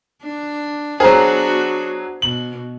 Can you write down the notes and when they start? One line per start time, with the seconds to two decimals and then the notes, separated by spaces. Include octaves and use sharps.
0.22 D4
1.00 F#3 B3 D4 F#4 G#4 C5 A#5
2.22 B2 F#7